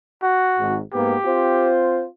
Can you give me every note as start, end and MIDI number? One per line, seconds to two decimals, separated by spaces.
0.22 0.79 66
0.59 0.79 32
0.59 0.79 44
0.93 1.15 44
0.93 1.15 58
0.93 1.15 59
0.93 1.71 67
1.25 2.05 60
1.25 2.05 65
1.25 2.05 72